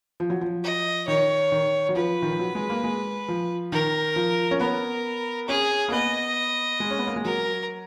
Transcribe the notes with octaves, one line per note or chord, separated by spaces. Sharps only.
F3
F#3
F3
D#5
D#3 C#5
D#3
F#3
F3 B4
D#3
F3
F#3
G#3
A#3
G#3
F3
D#3 A#4
F3
C#4
B3 A#4
C#4 G#4
A#3
B3 D#5
G#3
C#4
B3
A#3
G#3
F#3 A#4